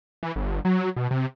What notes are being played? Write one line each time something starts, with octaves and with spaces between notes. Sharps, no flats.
E3
G1
F#3
B2
C3